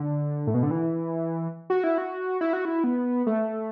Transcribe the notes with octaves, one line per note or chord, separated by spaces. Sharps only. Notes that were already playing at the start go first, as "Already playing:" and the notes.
Already playing: D3
A2
B2
D3
E3
F#4
E4
F#4
E4
F#4
E4
B3
A3